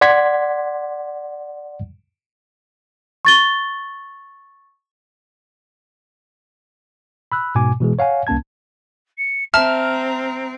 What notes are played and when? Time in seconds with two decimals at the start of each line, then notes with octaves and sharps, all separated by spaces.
0.01 D5 F#5 C6 G#6 B6
3.25 C#6 A6 G7
7.32 B5 E6 F#6
7.55 G#2 B2 G#5 D6
7.80 B2 E3 G#3 G#4
7.99 C#5 F5 F#5 G#5
8.27 C2 A#3 C#4 A5 G#6
9.18 C#7
9.54 C4 E5 A5 A#5 F6